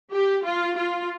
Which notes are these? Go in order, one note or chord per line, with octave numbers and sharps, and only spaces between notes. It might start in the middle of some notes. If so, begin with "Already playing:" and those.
G4
F4
F4